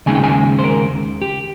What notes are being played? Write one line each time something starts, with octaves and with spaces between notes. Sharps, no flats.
D#2 C#3 G#3 D#4 G#5
G5
G#5
C5
A#4
G4